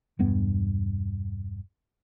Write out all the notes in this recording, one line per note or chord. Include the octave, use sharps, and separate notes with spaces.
E1 G2 B3